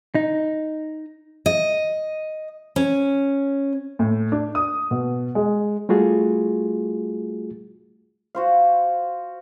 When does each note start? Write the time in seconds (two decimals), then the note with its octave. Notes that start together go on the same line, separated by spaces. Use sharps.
0.15 D#4
1.46 D#5
2.76 C#4
3.99 A2
4.32 D4
4.55 D#6
4.91 B2
5.35 G#3
5.89 G3 A3 F4 F#4 G#4
8.35 F#4 C5 F5